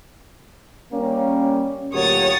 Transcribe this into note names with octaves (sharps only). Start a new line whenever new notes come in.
G3 A#3 C#4
D2 A#2 F#3 A#3 G4 C#5 D#6 A6